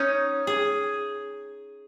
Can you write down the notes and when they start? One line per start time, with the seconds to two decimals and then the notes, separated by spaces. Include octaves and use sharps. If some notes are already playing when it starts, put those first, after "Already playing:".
Already playing: C#4 D#4
0.47 G#4